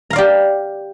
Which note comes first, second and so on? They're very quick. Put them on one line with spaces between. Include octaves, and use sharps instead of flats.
A#5 F5 D5 G4